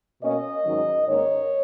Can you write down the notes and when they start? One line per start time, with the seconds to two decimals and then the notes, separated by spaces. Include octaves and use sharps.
0.22 B2 A#3 C#4 D#5
0.65 G#2 D#3 F#3 C#4
1.07 G#2 D#3 A#3 C#4 C#5